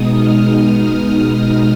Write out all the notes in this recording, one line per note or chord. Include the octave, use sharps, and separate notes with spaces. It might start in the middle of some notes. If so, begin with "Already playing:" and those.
Already playing: B2 G#3 B3 D#4 D#6
F6